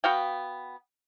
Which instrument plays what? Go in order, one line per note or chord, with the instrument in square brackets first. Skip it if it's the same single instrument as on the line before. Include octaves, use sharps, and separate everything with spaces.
[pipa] B3 F#4 F5 G5